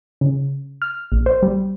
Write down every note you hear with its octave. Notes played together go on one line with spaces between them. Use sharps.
C#3
F6
A#1
C5
G3